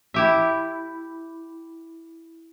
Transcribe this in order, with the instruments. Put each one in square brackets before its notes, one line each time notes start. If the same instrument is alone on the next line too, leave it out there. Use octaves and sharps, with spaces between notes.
[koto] E4 G4 E5